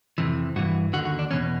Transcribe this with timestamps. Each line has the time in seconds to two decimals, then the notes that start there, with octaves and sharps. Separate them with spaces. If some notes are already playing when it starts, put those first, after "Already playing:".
0.18 F2 C3 E3
0.56 G2 E3 F#4
0.93 D#2 D3 F#4
1.05 F#4
1.19 D4
1.31 E2 B2 C#4